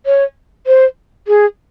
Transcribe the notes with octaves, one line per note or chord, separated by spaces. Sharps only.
C#5
C5
G#4